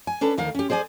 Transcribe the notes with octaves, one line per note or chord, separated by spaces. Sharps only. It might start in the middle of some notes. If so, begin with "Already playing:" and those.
G#5
C#4 D4 A4 B4
D2 D#3 F5
C#4 G4
G#4 C5 D5 G5 G#5